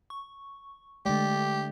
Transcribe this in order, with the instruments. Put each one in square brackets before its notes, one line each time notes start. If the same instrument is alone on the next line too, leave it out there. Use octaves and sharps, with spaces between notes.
[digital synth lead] C#6
[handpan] D3 A3 D5 [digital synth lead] G#3 [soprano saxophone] G4